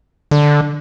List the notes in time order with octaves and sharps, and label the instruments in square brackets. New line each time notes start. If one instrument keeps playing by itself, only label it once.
[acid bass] D3